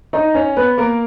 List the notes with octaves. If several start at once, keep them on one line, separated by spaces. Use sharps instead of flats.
D#4 D#5
C#4 C#5
B3 B4
A#3 A#4